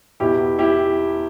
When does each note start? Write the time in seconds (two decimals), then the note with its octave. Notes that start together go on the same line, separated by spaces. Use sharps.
0.20 E2 B2 E4 G4
0.59 E4 G4